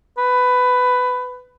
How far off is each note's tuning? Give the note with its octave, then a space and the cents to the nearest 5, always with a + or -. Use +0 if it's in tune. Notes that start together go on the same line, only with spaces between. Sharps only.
B4 +15